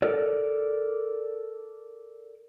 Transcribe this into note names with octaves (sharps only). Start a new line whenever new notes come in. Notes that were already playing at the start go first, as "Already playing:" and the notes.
A4 A#4 D5